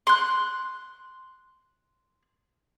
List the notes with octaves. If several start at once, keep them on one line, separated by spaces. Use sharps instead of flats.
C6 F#6